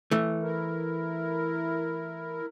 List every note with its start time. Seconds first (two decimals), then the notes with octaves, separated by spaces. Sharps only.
0.11 E3 A3
0.43 E4 A#4